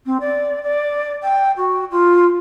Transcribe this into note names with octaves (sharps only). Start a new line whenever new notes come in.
C4
D5
D5
G5
F#4
F4